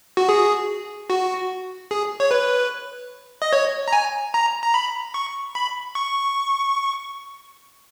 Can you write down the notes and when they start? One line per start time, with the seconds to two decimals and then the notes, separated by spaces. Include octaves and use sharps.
0.17 F#4
0.29 G#4
1.10 F#4
1.91 G#4
2.20 C#5
2.31 B4
3.42 D#5
3.53 C#5
3.88 A#5
3.93 G#5
4.34 A#5
4.63 A#5
4.74 B5
5.14 C#6
5.55 B5
5.95 C#6